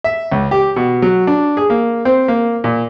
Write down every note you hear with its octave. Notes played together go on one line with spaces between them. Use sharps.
E5
C#2
G4
B2
F#3
D4
G#4
A#3
C4
A#3
A#2